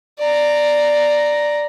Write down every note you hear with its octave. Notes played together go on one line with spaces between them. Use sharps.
D5 A#5